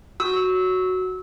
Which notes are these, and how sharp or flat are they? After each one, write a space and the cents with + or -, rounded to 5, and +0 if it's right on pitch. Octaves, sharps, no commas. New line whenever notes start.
F#4 +0 E6 -20